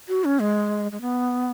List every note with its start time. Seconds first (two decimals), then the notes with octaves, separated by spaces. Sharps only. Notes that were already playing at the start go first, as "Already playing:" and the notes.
0.09 F#4
0.25 C#4
0.40 G#3
0.92 G#3
1.01 B3